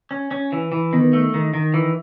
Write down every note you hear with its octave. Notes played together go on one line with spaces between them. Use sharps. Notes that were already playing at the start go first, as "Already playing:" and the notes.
C#4
C#4
E3
E3
D#3 B3
A3
D#3
D#3
E3